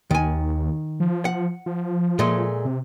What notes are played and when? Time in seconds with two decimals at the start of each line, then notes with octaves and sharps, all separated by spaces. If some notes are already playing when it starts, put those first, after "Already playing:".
0.11 D#2 D#3 G#5
1.00 F3
1.25 F#5
1.66 F3
2.19 A#2 G#3 A3
2.65 C3